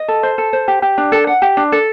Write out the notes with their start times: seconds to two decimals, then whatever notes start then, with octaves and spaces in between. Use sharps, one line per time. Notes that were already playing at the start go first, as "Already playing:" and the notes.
Already playing: D#5
0.08 A4
0.23 C5
0.38 A4
0.53 C5
0.68 G4
0.82 G4
0.98 D4
1.12 A4
1.27 F#5
1.42 G4
1.57 D4
1.72 A4